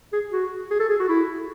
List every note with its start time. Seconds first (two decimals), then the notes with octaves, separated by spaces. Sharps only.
0.13 G#4
0.32 F#4
0.71 G#4
0.79 A4
0.89 G#4
0.99 F#4
1.09 E4